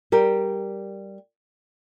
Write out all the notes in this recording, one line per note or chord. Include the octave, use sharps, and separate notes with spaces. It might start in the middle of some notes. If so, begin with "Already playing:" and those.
G3 G4 A#4